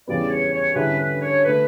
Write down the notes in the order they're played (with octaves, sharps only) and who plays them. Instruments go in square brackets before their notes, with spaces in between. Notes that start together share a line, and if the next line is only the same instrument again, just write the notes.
[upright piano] E2 C#3 G3 B3 [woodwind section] D5
[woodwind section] C#5
C#5
[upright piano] D3 G3 C#4 E4 [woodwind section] B4
[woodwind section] B4
C#5
[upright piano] D3 A3 [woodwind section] B4